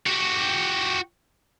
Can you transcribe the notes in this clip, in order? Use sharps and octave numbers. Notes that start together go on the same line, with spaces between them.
F#4 G4